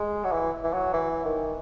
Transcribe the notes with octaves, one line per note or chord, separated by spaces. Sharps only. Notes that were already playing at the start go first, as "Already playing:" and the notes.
Already playing: G#3
F#3
E3
E3
F#3
E3
D#3